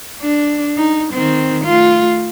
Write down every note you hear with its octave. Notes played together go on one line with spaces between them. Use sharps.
D4
D#4
D#3 C4
A3 F4